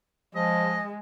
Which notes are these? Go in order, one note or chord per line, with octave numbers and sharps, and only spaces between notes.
F3 G#3 D#5